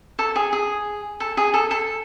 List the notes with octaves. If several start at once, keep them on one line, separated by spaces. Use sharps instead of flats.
A4
G#4
G#4
A4
G#4
A4
A4